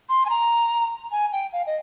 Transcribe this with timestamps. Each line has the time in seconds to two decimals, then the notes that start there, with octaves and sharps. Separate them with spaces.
0.09 C6
0.26 G#5
0.30 A#5
1.12 G#5
1.32 G5
1.53 F5
1.67 D#5